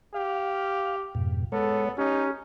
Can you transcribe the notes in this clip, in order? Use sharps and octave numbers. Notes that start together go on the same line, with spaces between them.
G4 F5
F2 G#2 B2
G#3 B3 A4 C#5
C#4 D#4 G4